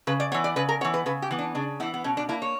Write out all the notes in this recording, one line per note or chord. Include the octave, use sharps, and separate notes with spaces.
C#3 B4
D5
E3 B3 C#5
D5
C#3 B4
A#4
E3 B3 C#5
B4
C#3 B4
G4
E3 B3
D4
C#3 D4
E3 B3 E4
B3
B2 C#4
D4
A#3 E4
C#5